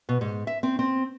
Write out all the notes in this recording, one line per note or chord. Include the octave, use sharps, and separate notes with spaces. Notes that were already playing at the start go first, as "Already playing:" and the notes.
B2
G#2
E5
C4
C4